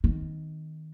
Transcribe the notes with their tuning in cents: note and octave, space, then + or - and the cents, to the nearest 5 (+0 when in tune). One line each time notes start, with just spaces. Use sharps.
D#3 +10 C4 -45